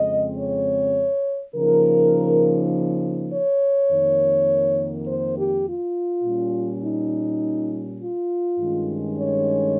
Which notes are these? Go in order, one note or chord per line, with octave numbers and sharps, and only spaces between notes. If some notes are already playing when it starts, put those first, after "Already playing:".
Already playing: F2 C#3 G#3 C4 D#5
C#5
C#3 F3 A#3 D#4 A#4
C#5
F2 D#3 A#3
C5
G4
F4
A#2 G3 C#4
D#4
F4
G2 D#3 G#3 C#4
C#5